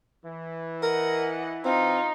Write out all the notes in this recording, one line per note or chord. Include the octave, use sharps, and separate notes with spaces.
E3
A#4 D#5 F#5
C4 D#4 F4